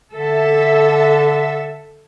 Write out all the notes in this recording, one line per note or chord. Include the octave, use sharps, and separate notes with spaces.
D3 A4 E5